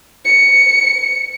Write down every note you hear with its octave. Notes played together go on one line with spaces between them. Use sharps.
C#7